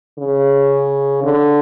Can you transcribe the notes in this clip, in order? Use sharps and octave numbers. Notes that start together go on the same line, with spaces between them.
C#3
D3